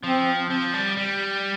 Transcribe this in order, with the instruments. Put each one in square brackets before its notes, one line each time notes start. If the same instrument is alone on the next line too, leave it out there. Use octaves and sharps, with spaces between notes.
[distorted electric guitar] F3 [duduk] C4
[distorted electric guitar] F3
G3
G3